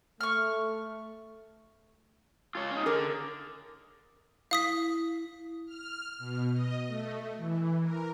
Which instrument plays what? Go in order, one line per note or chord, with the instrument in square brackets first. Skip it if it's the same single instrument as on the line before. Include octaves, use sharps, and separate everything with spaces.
[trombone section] A3 [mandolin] C#6 F6
[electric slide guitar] F4 C#5
C#4 D#4
[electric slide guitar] D3 [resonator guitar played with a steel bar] G#4 A#4
[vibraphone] E4 [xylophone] F5 D#6 B6
[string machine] F6
B2
D#5
A3
E3
A#4